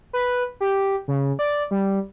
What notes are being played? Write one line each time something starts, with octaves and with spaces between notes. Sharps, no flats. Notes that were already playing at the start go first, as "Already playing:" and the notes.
B4
G4
C#3
D5
G3